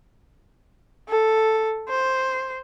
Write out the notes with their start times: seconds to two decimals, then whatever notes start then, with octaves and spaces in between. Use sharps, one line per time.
1.09 A4
1.89 C5